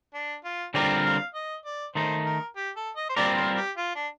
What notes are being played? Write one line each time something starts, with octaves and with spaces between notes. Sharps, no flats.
D4
F4
D3 G3 C4 F4 A#4 D5
F5
D#5
D5
D#3 A3 D#4 C5
A#4
G4
A4
D#5
C5
G3 C4 F4 A#4 D5
C5
G4
F4
D4